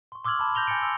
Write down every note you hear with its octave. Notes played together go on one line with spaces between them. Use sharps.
C6 C#6
C6 D6 E6 F6 G#6 F#7
A5 B5
G6 A#6 F7 G7
G#5 G6 A6 C#7 D7
C6 E6